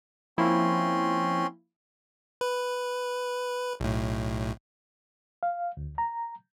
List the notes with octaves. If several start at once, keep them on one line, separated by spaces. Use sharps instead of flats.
F3 A#3 C4 C#4 E4 C6
B4
B1 A2
F5
D2
A#5